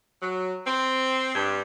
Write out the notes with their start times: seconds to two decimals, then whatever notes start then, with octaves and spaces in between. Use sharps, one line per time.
0.22 F#3
0.66 C4
1.34 G2